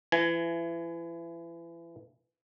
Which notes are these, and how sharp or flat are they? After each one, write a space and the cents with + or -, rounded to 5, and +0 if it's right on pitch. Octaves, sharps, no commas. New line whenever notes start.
E3 +30 G#5 +15